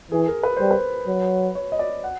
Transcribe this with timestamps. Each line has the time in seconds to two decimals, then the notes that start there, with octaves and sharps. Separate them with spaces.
0.12 E3 G#4
0.28 A#4
0.43 B4
0.57 G3 C5
0.71 B4
1.08 F#3
1.55 C#5
1.72 D#5
1.79 D5
2.04 F#5